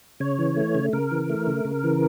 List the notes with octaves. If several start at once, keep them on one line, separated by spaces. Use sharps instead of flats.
C#3 C#5
E3
A3
C#3
C#3 A#4
E3
A3
C#3
C#3
E3